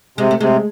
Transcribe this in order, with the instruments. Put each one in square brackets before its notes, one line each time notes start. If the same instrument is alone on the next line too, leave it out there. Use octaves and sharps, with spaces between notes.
[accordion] C3 [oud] G#3
[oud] A3
[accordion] C3 [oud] G#3